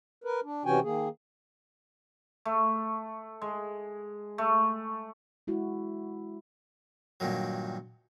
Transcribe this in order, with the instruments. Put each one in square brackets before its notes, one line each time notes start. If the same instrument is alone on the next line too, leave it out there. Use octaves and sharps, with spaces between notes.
[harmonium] A#4 B4
D4
C3 E3 C#4 F#4 G5 G#5
D#3 A#3 G#4
[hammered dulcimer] A3
G#3
A3
[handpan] G#3 E4 F#4
[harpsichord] G2 A#2 D#3 F#3